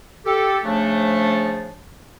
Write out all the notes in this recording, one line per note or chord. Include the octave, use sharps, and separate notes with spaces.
G4 A4
C#3 F3 A3 D4